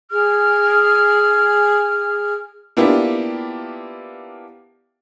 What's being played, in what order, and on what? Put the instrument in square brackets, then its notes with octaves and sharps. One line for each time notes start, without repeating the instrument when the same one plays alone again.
[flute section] G#4 F6
[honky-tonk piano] A#3 B3 D4 E4 F4 G4